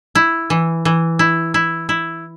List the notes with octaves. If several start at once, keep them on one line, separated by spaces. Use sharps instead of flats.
E4
E3
E3
E4
E4
E4